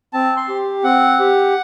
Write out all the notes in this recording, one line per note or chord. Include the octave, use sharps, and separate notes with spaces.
C4 A5
C6
G4
C4 F#5
G4